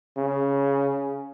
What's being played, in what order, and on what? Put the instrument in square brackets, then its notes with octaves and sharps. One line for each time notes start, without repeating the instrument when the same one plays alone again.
[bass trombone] C#3